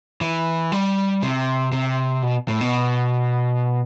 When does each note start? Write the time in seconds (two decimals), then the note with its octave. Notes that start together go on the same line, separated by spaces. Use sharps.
0.21 E3
0.72 G3
1.22 C3
1.72 C3
2.22 B2
2.48 A2
2.61 B2